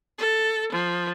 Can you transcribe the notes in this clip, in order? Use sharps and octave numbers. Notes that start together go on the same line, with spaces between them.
A4
F3